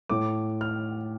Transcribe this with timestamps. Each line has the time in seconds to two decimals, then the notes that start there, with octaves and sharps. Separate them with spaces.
0.09 A2 A3 D6
0.61 F6